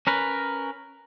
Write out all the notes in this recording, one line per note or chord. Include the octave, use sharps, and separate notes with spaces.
C#4 A#4 B4